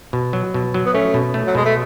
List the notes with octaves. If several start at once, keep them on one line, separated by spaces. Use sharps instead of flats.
B2
F#3
B2
F#3
B3
A3 C#4
B2
A3
F#3
B2 G#3
A3